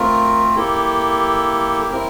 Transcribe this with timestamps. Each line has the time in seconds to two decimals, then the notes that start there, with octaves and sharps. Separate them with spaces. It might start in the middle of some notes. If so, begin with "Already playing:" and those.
Already playing: A3 C4 F4 A#4
0.56 A#3 E4 G4 A4
1.91 C4 E4 A#4